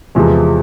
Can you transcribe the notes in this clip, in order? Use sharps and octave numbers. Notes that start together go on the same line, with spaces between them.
E2 C3 F3 G#3